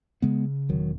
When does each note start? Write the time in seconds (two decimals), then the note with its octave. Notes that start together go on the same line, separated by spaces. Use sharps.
0.22 C#3 G#3 B3
0.69 E1 D#3 F#3